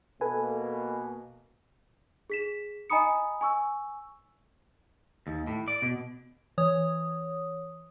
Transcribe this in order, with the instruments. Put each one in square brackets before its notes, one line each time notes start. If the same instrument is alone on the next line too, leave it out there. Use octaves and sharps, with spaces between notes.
[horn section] B2 A#3 [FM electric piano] A4 B4 G#5
[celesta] G#4 B6 E7
D#5 G#5 A#5 B5 D#6 C#7
G#5 C#6 E6
[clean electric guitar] D#2
A2
D5
B2
[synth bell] E3 C#5 D#6